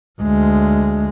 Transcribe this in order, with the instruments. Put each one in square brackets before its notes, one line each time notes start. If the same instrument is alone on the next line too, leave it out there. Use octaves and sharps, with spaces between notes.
[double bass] D2 G#3